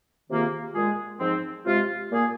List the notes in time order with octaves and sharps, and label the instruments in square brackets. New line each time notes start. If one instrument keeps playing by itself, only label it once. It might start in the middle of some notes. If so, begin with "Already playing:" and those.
[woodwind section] C3 D#3 A#3 F4 G#4
A#2 G#3 F4 G#4
G#2 F3 C4
C3 G#3 F4
A#2 A#3 G#4